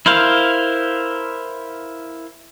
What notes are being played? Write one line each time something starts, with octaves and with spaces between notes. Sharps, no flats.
E4 A#4 C5 F5